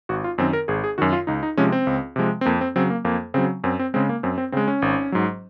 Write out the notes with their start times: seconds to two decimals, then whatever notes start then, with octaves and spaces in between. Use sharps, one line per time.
0.09 G#1 F#4
0.24 F4
0.38 F#2 D#3 C4
0.53 A#4
0.68 G#1 G#4
0.84 G#4
0.98 F#2 D#3 F#4
1.13 F4
1.27 C#2 D#4
1.43 D#4
1.57 C3 F3 G#3 C#4
1.72 C4
1.87 C#2
2.16 C3 F3 G#3
2.41 C4
2.46 F2 A#3
2.61 C4
2.76 C#3 F#3 C4
2.90 A#3
3.05 F2 A#3
3.34 C#3 F#3 C4
3.64 F#2 C4
3.79 C4
3.94 C#3 G#3 C4
4.09 A#3
4.23 F#2 C4
4.38 C4
4.52 C#3 G#3 C4
4.68 C#4
4.82 G#1
5.12 G#2 F#3